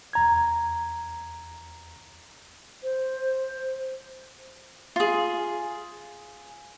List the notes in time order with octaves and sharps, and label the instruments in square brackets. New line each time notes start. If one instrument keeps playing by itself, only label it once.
[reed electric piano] E2 A#5 G#6
[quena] C5
[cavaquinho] F4 G#4